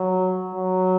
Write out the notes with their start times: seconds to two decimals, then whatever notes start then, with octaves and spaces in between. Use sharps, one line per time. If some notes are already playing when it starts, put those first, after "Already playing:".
Already playing: F#3
0.54 F#3